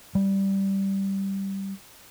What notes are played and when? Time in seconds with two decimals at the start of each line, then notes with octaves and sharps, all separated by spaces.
0.15 G3